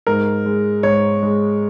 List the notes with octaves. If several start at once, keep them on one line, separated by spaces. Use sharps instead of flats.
G#2 A#4
G#3
G#2 C#5
G#3